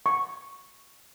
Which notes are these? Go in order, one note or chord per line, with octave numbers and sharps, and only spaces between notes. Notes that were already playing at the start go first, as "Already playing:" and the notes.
C#6